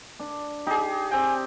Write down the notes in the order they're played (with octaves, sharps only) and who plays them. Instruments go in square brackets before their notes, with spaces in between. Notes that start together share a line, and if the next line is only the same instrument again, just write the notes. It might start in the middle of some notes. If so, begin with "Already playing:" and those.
[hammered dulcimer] D4
[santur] D#4 G#4 [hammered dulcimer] G4
[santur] C4 G5 [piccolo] G#5